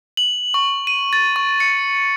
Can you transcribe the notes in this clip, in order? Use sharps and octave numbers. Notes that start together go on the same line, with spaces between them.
F#7
C#6
D#7
A6
C#6
C#7